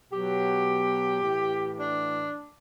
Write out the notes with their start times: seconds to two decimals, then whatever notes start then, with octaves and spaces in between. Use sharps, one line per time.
0.12 B2 F#3 G4
1.21 A2 E3
1.76 D4